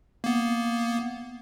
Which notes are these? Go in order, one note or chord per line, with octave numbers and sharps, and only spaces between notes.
A#3 B3